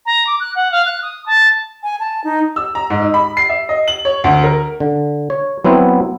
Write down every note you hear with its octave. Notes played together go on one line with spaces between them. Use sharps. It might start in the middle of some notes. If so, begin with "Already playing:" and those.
A#5
D6
F#6
F#5
F5
F#6
D#6
A5
G#5
A5
D#4
E6
A#5
G#2
D#4
B5
C7
E5
D#5
F#7
C#5
D2
A#4
D3
C#5
F#3 B3 C4 E4